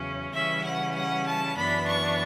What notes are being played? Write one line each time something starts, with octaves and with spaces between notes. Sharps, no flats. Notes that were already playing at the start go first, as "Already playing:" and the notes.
Already playing: E2 C#3 F#3 C#4
C#3 E3 G3 C#4 E5
F#5
F#5
A5
F#2 E3 B3 D4 B5
C#6